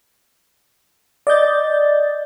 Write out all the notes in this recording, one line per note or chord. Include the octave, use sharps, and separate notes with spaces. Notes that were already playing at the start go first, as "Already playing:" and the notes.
D5 D#5 G6 A6